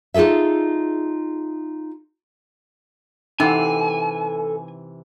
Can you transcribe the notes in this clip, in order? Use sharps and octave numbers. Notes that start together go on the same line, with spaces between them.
D#4 F4 G#4 A4 E5
C3 E3 D#4 A4 F#5 G#5